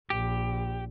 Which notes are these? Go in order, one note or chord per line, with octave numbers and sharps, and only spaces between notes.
A#1 G4